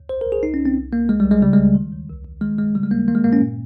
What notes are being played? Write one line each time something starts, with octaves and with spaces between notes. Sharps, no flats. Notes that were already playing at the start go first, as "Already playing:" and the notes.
Already playing: D#2
C2 C5
A#4
C2
G#4
C2 D#4
C#4
C2
C4
C2
C2 A#3
C2 G#3
G3
C2
G#3
C#3 G3
C#2 G#3
D#3
D#2
C2
C2
D#3 G#3
G2 G#3
C#3 G3
G#3
D#2 A#3
D#3 A#3
G#3
G2 A#3
C#4
A#2